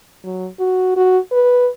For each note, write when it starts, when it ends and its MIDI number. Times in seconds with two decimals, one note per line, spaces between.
0.24 0.48 54
0.60 0.95 66
0.97 1.18 66
1.32 1.68 71